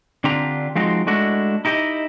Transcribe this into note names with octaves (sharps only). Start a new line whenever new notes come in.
D3 C4 D4 F4 G4 A#5
F3 G#3 C4 D#4 F#4
G#3 A3 D4 E4 F#4
D#4 E4 G4 D#5